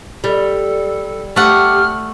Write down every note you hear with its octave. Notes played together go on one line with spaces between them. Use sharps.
G3 A4
A3 G4 F#5 F6